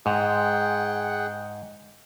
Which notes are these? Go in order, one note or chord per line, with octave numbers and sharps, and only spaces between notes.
G#2 G#4 F#5 G5